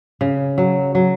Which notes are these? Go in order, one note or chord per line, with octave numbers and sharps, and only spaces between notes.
C#3
F#3
F#3